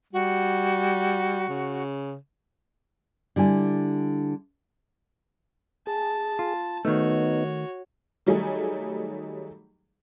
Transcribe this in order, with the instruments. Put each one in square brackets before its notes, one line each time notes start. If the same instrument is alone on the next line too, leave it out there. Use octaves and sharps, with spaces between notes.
[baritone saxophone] G3 [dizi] F#4
[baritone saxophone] C#3
[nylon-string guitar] D3 G3 E4 G#5
[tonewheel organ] G#4 [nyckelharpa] A5
[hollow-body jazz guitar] F4
[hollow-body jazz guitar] D#3 A3 [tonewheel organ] B3 D#4 [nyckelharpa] F#4 C#5
[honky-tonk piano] D#3 F#3 G3 A3 D#4 G#4